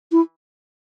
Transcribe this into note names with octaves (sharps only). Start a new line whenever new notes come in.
E4